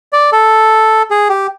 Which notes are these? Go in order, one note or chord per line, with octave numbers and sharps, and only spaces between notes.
D5
A4
G#4
G4